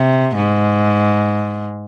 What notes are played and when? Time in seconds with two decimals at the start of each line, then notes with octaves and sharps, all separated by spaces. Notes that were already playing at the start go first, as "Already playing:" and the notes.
Already playing: C3
0.36 G#2